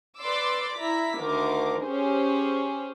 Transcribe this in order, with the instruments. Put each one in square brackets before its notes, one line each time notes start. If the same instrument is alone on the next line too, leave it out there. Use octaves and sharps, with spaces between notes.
[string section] B4 D5 C6 D6 E6
E4 A#5 B6
D2 D#3 A#4 D6
C#4 G4 G#4 C5